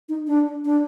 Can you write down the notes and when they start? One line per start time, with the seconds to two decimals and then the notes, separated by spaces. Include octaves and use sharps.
0.09 D#4
0.27 D4
0.65 D4